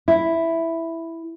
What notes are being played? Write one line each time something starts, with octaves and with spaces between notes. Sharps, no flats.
E4